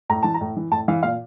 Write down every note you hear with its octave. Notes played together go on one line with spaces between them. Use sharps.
A2 A#5
E3 A5
A#5
A2
E3
A2 A5
E3 F5
A#2 F5